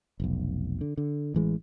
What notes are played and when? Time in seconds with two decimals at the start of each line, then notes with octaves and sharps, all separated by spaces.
0.20 F1 B1
0.81 D3
0.97 D3
1.34 A1 E3 G#3